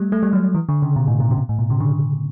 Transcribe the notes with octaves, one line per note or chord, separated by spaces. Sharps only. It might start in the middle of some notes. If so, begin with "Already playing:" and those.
Already playing: G3 A3
A3
G3
F#3
E3
D3
C#3
B2
A2
B2
C#3
B2
A2
B2
C#3
D3